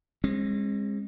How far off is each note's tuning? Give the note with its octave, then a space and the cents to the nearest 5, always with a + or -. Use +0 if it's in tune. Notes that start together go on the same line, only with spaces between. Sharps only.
G#3 -25 C4 +45